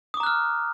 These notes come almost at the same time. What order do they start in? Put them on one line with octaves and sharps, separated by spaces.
D#6 D6 A#5 F#6 F6